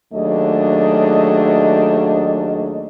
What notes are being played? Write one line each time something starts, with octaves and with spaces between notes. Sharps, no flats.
D#2 F#3 A3 D4 G#4 D#5